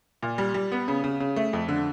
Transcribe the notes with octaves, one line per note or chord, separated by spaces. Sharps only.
A#2
G3
G3
B3
C#3
C#3
C#3
A3
F2
D3